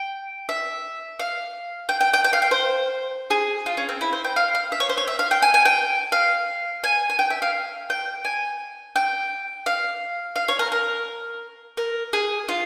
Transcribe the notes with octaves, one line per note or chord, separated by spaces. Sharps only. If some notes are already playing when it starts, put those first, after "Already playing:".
Already playing: G5
E5
F5
G5
G5
G5
G5
F5
G5
C5
G#4
F4
C#4
C4
E4
C5
G5
F5
F5
E5
C#5
C5
C#5
E5
F5
G5
G#5
G#5
G5
F5
G#5
G#5
G5
E5
F5
G5
G#5
G5
F5
F5
C#5
A#4
A#4
A#4
G#4
F4